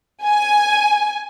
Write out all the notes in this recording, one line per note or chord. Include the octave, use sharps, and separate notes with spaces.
G#5